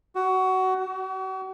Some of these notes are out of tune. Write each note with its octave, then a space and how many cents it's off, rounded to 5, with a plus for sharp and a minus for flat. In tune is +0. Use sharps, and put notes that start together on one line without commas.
F#4 +20
F#4 +40